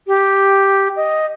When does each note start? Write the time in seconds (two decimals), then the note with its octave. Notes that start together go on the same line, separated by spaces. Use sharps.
0.07 G4
0.96 D#5